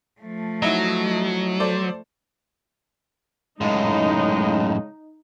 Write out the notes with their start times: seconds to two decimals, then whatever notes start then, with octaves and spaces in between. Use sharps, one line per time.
0.21 F3 A3
0.62 F#3 D#4 E4
1.60 A4 C5 D5
3.61 F#2 A2 C#3 G#3 D#4